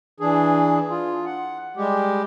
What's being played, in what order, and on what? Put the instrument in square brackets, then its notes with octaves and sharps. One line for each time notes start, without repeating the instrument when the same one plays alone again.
[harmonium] E3 D4 G#4
F4
F#5
G3 G#3 G4